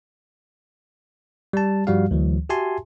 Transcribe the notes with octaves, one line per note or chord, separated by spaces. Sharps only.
G3 A5
G2 F3 G3 F#4 F5
D2 E3 F#3
F#4 G4 E5 G#5 A5 C6